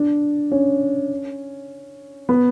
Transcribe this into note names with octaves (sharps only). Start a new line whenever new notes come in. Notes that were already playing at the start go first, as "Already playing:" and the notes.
Already playing: D4
C#4
B3